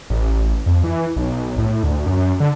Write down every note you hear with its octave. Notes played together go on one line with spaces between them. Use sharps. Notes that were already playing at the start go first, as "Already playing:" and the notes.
A1
F2
E3
B1
A2
D2
F#2
D3